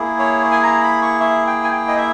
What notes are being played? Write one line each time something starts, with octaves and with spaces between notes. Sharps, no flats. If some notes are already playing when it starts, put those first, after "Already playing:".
Already playing: A#3 E4 G#4
C#5
G#5
A#5
B5
C#6
E5
G5
G#5
G5
D#5
E5